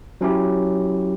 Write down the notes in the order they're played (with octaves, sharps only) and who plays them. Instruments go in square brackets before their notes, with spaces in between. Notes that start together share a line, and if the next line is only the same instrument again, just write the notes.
[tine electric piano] F#3 C#4 E4 G4